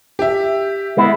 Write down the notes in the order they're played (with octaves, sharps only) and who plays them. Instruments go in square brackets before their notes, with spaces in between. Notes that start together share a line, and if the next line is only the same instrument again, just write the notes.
[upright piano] G4 E5
[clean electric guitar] G#3 B3 E4